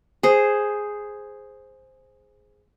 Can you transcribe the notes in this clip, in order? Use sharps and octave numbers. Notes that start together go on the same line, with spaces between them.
G#4 C5